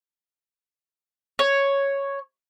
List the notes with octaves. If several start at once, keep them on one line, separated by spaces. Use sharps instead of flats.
C#5